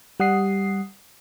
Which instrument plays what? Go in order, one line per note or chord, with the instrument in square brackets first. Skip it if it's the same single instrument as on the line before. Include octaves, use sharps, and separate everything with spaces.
[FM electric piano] G3 F#5 D#6 C7